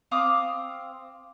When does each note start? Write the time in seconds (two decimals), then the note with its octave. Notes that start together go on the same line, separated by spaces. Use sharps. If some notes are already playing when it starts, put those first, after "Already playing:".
0.11 C4 F5 D6 D#6